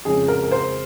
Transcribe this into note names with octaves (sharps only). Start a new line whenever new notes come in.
F2 C#3 G#3 C#4 G#4
A#4
A#4
C5